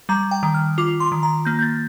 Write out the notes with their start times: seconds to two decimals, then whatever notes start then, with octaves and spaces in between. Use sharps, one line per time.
0.09 G3 A#5
0.31 G5
0.43 D#3
0.55 F6
0.78 F4 D6
1.00 C6
1.12 D#3
1.23 A#5
1.45 A#3 G6
1.59 G6
1.63 A6